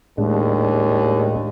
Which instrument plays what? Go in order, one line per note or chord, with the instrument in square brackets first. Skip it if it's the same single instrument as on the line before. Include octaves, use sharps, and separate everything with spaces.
[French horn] D#2 [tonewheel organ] A2 G#3 D4